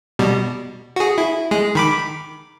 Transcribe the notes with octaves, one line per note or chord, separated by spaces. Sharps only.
B2 G3
F#4 G#4
E4
G#3 G#4
D#3 B5 D6